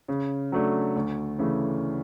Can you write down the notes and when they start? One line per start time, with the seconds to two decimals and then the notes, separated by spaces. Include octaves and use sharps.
0.08 C#3
0.52 F#3 A3 D4
0.96 D2
1.39 C#3 E3 A3